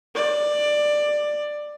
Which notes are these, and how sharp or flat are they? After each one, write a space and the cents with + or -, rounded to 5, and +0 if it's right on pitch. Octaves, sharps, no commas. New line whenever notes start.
D5 +15